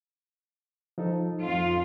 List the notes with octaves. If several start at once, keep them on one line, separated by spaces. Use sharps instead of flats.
F3 D#4 A4
F2 F4